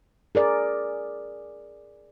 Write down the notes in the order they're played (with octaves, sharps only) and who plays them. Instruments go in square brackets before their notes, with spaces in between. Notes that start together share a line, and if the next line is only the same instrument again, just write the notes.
[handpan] G#4 A#4 D5